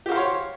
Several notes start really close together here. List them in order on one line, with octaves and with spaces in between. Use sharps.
G4 F#4 F5 C5 C#5